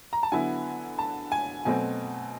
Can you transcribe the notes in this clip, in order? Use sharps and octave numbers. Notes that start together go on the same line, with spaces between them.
A#5
A5
D3 F#3 B3 E4 G#5
A5
G#5
B2 F#3 A3 C4 G#5